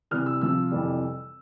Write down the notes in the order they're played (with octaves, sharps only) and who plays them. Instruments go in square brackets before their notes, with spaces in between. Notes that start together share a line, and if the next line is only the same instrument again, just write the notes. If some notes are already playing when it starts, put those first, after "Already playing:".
[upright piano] C3 E3 G3 F6
E6
C3 F3 C4 E6
F2 C3 E3 G3